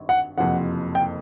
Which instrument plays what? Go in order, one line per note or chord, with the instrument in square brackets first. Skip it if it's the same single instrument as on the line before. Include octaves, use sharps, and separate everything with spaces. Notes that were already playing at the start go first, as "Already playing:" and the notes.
Already playing: [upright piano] G#1 G2
[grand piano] F#5
[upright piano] F#1 F2 C3 F3 [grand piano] F#5
[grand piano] G5